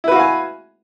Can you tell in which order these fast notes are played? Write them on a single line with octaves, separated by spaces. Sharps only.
E4 B4 F#4 F5 G#5